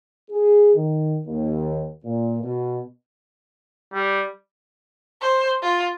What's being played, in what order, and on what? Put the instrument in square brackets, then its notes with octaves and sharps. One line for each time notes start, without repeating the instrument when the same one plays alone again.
[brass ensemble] G#4
D#3
D#2
A#2
B2
[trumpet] G3
[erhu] C5
F4